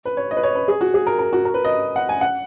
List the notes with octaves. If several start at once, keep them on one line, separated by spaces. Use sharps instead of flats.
B4
C#5
D#5
B4
C#5
B4
G#4
F#4
G#4
A#4
A#4
F#4
A#4
B4
D#5
F#5
G#5
F#5